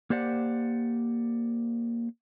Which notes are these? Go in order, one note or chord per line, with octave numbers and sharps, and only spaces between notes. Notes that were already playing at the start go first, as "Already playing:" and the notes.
A#3 G4 C5 D5 F#5